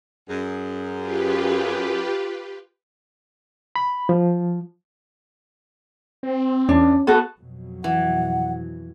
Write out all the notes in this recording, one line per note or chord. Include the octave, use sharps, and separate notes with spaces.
F#2 G#4
F4 G4 B4
B5
F3
C4
E2 C#4 D4
B3 F#4 A4
F2 B2 F#3
E3 F#5